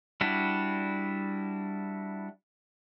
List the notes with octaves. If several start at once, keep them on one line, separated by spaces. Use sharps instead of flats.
G3 D4 E4 F#4